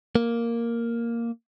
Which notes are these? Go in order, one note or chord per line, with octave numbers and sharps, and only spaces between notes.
A#3